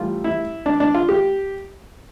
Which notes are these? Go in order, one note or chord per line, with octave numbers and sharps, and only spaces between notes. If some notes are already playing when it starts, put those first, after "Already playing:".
Already playing: A1 A2 E3 G3 F4
E4
D4
D4
F4
G4